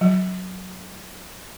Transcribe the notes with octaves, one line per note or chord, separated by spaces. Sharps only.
F#3